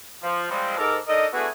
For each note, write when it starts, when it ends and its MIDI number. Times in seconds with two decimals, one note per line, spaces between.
0.22 0.46 53
0.49 0.74 53
0.49 0.74 55
0.49 0.74 56
0.49 0.74 60
0.77 0.97 44
0.77 0.97 69
0.77 0.97 70
0.77 0.97 86
1.07 1.26 62
1.07 1.26 63
1.07 1.26 69
1.07 1.26 70
1.07 1.26 75
1.33 1.46 57
1.33 1.46 59
1.33 1.46 62
1.33 1.46 64
1.33 1.46 66
1.33 1.46 68